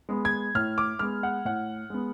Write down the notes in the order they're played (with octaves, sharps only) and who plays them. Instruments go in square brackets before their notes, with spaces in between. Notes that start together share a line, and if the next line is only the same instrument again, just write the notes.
[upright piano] G#3 B3
G#6
A2 F6
D6
G#3 B3 F6
F#5
A2 F#5
G#3 B3